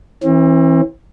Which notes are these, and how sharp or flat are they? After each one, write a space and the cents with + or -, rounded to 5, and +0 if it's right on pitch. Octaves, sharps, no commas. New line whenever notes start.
E3 -15 C4 +40